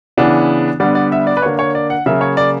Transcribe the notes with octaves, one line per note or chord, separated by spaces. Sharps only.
C#3 E3 B3 D4
D3 G3 B3 D4 D5
D5
E5
D5
B4
D3 A#3 D4 C#5
C#5
D5
F#5
C#3 F#3 A#3 E5
C#5
D5